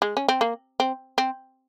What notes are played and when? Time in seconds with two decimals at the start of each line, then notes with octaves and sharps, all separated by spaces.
0.02 G#3
0.17 C#4
0.28 C4
0.41 A#3
0.80 C4
1.18 C4